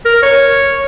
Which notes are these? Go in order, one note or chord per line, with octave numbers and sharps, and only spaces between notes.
A#4
C#5